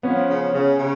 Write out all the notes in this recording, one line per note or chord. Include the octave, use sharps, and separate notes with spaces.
F3 B3 C#4
C#3
C#3
C#3